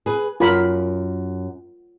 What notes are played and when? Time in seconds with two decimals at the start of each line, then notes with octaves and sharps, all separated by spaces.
0.06 G#4 B4
0.40 F#2 F4 A#4 B5